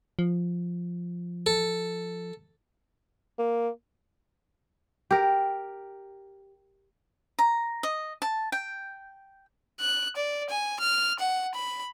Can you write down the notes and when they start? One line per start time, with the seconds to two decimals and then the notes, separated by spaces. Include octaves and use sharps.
0.19 F3
1.46 A4
3.38 A#3
5.11 G4 A#4
7.39 A#5
7.83 D#5
8.22 A5
8.52 G5
9.80 F#6
10.16 D5
10.50 G#5
10.80 F6
11.19 F#5
11.54 B5